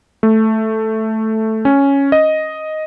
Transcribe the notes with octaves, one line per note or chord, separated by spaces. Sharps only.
A3
C#4
D#5